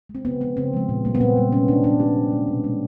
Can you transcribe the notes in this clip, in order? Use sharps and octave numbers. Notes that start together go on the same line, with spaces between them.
G#3
C4
C#3 B3
F3 G#3 B3
C#3 C4
F3 G#3
A#2
G3 A#3
B3
A#2 C4
G3 A#3
C3 C#4
D#3 G#3 D4
C3 D4
D#3 G#3 G4
B2
G#3
B2
G#3